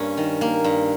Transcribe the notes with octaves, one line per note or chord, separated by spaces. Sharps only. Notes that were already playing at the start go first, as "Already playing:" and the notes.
Already playing: G2 A#3 C#4
D#3
A#3
G2